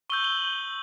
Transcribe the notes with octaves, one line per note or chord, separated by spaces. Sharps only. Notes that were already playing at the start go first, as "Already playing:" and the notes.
C#6 E6 G6 G7
F#7